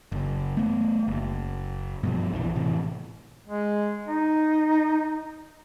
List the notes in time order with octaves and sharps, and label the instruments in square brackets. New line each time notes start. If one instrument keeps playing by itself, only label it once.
[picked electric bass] F#1
A3 B3
F#1
G2 B2 F3
A#1 F2 D3 E3
A2 C3 E3
[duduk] G#3
D#4